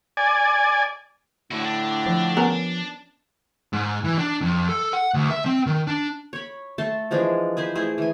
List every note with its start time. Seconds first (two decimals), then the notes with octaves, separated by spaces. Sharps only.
0.17 D5 G#5
1.51 A2 D3 E4 F#4
1.64 D4
2.06 F3
2.37 B3 C#4 A#4
3.73 G#2
4.04 E3
4.18 D4
4.41 F2
4.69 A4
4.93 F#5
5.14 D2
5.31 E5
5.45 C4
5.66 D#3
5.87 D4
6.33 C#5 B5
6.78 A3 A4 A5 C6
7.11 E3 F3 G#3 D4
7.57 G#4 B4 C5
7.75 A3 E4 G#4 C5
7.98 E3 G#5